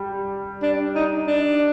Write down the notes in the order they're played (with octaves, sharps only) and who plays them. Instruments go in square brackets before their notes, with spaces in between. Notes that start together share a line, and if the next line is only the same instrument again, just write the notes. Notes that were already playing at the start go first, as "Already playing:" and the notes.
Already playing: [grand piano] G3
[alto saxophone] D4
D#4
D4